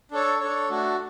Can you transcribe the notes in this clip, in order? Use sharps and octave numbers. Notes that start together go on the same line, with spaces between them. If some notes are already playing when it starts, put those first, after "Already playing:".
D4 A4 C#5
D4 A4 C#5
A3 D4 F#4